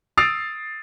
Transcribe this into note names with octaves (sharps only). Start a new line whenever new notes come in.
D#6 E6 A6 C7 D7 F7